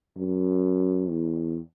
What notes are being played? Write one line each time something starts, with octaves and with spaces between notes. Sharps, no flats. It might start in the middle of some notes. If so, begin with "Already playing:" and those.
F#2
E2